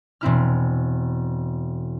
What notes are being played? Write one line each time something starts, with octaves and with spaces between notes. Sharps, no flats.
E1 C4 E4 F6